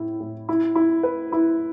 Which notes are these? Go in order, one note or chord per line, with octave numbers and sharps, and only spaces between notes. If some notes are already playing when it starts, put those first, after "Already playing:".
Already playing: A2 E4
A2
E4
E4
B4
E4